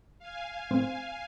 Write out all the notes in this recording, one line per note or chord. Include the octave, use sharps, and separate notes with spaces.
F5 G#5
A2 C4 C5